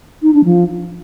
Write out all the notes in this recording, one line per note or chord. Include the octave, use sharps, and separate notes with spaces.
D#4
D4
F3